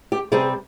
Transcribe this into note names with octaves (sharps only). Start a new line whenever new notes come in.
G4
C3 G3 C4 G#4